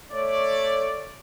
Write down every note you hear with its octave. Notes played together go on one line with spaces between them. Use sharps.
A3 C#5 D5